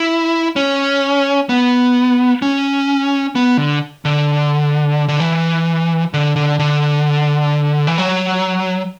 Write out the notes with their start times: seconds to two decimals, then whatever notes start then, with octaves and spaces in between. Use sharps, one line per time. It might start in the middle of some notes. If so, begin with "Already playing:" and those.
Already playing: E4
0.56 C#4
1.49 B3
2.42 C#4
3.35 B3
3.57 D3
4.05 D3
5.08 D3
5.20 E3
6.14 D3
6.36 D3
6.59 D3
7.87 E3
7.98 F#3